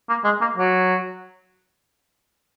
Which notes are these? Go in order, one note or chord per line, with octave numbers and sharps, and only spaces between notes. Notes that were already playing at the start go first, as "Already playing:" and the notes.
A#3
G#3
A#3
F#3